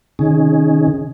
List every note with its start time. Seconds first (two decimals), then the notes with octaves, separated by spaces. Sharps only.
0.19 C3 D#3 C#4 D#4 G#4